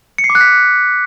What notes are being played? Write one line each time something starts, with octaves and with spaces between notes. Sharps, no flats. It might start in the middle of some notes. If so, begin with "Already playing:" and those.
C#7
C7
D6
F#6
B6